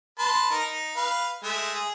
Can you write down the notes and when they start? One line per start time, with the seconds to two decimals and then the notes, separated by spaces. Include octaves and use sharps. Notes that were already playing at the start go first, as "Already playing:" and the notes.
0.19 B4 A5 C6
0.51 D#4 A#4
0.65 D#4
0.96 B4 F5
1.43 G#3 A3 E5
1.75 G#4